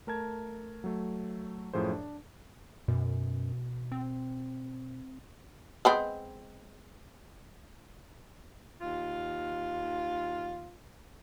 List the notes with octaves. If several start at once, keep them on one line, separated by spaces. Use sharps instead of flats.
A3 A#4 A5 G#6
F#3 A3
F#2 A2 F3 G#4 C5
D4
F#2 B2
C4
G#3 B3 C4
D#2 F4